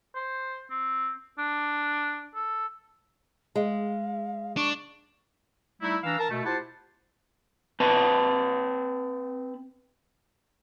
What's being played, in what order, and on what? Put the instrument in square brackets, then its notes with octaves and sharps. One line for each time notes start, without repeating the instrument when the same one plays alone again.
[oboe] C5
C4
D4
A4
[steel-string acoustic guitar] G#3 [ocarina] F5
[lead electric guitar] D4 [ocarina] C#6
[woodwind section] G3 A3 D#4 E4
E3 D4 F5 A#5 E6
A#4 A5 A#5
B2 A3
E4 F4 G4 C5 F#5 A5
[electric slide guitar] C4 B4 A5